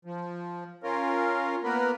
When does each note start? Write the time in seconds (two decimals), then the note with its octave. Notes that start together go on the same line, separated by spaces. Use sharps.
0.05 F3
0.83 C#4 F4 A#4
1.64 A#3 B3 A#4 B4